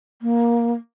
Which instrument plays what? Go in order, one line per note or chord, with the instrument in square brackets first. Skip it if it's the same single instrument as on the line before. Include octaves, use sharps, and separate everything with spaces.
[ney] A#3